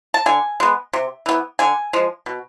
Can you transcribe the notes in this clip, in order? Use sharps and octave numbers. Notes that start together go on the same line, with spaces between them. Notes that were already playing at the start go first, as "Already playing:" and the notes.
A5
D3 G#5
G#3 B3
C3
E3 B3
D3 G#5
F3 G#3
B2